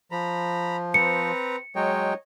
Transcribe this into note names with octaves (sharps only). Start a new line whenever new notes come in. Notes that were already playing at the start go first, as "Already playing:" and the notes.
F3 A#5 B5
C4 B4 A#5 C#7
F#3 G#3 C#5 D#5 G5